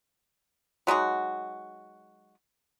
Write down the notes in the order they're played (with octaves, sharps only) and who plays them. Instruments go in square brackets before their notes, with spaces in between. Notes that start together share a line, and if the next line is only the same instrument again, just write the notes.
[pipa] F#3 G#3 D#4 F#4